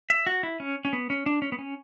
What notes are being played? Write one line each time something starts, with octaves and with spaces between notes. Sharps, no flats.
E5
F#4
E4
C#4
C#4
B3
C#4
D4
C#4
B3
C#4